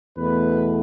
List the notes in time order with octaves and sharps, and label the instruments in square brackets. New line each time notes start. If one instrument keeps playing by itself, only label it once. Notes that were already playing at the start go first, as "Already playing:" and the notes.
[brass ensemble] E2 B2 A3 B4